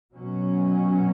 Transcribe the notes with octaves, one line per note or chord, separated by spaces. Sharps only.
B2 F#3 C#4